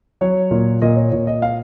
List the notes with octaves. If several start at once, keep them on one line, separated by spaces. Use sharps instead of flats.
F#3 C#5
A#2
A#2 D#5
C#5
A#2 C#5
D#5
F5